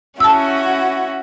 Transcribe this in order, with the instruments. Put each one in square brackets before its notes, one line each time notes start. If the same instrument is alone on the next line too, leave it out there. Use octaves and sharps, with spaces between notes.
[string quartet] C#4 E4 F#4 [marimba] A5 E6